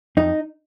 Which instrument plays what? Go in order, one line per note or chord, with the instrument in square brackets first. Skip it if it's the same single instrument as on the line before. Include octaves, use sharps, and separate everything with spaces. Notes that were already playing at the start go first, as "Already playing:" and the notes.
[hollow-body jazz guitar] F2 D#4